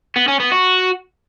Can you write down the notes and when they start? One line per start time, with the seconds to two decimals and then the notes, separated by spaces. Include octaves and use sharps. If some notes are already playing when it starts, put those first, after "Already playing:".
0.16 B3
0.28 C#4
0.40 B3
0.52 F#4